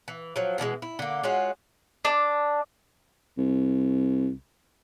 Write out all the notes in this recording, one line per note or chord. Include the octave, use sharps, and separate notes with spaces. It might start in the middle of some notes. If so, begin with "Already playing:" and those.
E3
F3 F#3
B2 E3 G3 G#3
E4
D3 A#3
G#3 C#4 F4 F#4
D4
C2